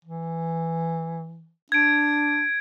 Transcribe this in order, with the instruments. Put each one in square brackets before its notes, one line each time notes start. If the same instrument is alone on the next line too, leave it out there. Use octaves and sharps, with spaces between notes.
[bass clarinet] E3
[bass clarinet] D4 [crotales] G#6 D7